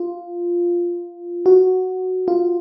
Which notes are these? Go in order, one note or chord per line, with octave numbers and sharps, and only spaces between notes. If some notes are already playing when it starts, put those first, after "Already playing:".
Already playing: F4
F#4
F4